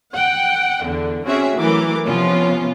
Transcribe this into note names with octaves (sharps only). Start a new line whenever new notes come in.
F#5 G5
E2 D3
C4 C#4 F#4 G#4 E5
E3 F#3 A3 A#4 D6
C3 F3 B3 C#4 F4